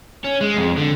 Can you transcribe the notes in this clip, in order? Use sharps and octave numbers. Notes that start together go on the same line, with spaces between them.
C#4
G#3
F2
D3